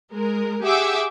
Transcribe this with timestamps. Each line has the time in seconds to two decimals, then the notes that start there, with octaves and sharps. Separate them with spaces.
0.13 G#3 A#4
0.63 G4 G#4 E5 F#5 D6 E6